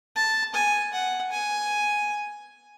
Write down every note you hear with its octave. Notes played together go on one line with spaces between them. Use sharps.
A5
G#5
F#5
G#5